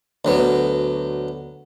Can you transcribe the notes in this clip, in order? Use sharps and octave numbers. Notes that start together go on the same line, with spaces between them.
D2 F#3 B3